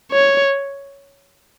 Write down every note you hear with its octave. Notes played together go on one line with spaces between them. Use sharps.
C#5